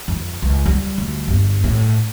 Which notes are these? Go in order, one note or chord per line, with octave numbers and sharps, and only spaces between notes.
F2
C#2
G3
D2
G1
A2